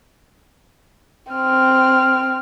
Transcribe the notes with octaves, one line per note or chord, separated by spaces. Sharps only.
C4 F6